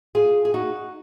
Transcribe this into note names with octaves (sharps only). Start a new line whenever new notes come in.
F4 G#4
G#4
D#4 F#4